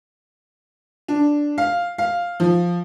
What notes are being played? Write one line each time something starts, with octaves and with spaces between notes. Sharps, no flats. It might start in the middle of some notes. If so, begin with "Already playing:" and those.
D4
F5
F5
F3